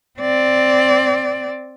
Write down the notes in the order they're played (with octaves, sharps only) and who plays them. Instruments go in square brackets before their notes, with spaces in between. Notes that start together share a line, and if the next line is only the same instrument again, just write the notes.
[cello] C4 D5